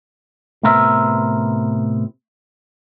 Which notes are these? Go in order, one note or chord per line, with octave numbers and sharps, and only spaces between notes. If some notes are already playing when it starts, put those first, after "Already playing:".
A2 C3 B3 A#4 C5 E5